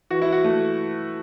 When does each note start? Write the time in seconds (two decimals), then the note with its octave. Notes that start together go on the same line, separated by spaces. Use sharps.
0.11 E3 F#4
0.22 E4
0.32 F#4
0.44 A3